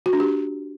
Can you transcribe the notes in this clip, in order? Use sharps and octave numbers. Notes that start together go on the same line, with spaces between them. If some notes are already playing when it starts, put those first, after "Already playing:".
F#4
D4
G4